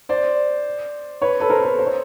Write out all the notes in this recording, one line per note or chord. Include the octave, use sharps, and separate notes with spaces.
C5 D5
B4 C#5
A4 B4
A#4 C5
A4 B4
C5
C#5